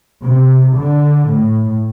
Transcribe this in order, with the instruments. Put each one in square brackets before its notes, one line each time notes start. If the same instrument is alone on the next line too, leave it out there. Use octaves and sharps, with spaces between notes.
[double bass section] C3
D3
A2